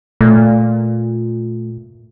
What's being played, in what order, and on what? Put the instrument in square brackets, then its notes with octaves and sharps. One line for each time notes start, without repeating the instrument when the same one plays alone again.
[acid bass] A#2 [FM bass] A3